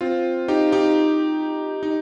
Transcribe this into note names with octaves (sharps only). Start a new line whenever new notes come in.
C4 F4
D#4 G4
D#4 G4
D#4